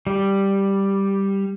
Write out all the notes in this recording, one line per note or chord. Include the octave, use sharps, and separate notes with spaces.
G3